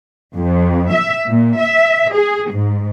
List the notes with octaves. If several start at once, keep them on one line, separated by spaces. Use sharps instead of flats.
F2
E5
A#2
E5
G#4
G#2